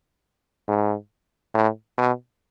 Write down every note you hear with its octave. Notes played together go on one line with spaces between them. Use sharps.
G#2
A2
B2